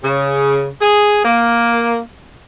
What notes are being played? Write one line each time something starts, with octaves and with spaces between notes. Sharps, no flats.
C#3
G#4
A#3